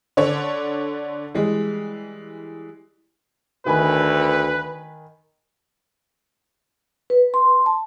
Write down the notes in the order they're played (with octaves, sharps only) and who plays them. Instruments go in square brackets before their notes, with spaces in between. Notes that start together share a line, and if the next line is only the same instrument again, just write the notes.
[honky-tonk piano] D3 D4 C#5
E3 G3 G#3
[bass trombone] D2 [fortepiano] D#3 G#5 B5 [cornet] B4
[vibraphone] B4
C6
A5